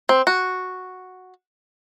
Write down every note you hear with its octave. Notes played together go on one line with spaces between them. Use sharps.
C4
F#4